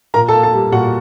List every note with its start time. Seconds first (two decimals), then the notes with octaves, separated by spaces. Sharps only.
0.14 A#2 A#4 A#5
0.28 A4 A5
0.33 A#3
0.43 A4 A5
0.53 G3
0.72 A#2 F#4 F#5